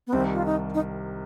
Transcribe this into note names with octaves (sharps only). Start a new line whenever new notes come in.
B3
C2 C3 D#3 G3 C4
F4
D#4
D#4